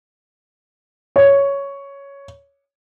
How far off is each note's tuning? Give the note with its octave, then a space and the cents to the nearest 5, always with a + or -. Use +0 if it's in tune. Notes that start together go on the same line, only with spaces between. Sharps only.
C#5 +5